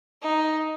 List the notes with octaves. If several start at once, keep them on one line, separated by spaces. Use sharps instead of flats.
D#4